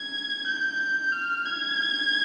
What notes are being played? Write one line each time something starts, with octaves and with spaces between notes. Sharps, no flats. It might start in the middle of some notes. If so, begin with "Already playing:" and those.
Already playing: G#6
G6
F6
G#6